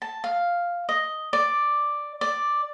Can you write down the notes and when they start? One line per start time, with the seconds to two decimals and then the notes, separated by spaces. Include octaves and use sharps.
0.02 A5
0.24 F5
0.89 D#5
1.33 D5
2.21 D5